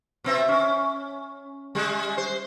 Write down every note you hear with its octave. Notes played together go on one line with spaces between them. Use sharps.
B2 C4 E5
C#4
G3 G#3
C5